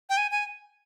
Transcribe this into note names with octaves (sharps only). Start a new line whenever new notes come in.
G5
G#5
G#5